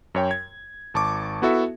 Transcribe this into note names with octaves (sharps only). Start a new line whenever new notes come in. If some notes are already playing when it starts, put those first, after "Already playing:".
F#2 C#5 G5
G#6
G#1 A5 C#6 D6
B3 E4 F#4 A4 E5 A5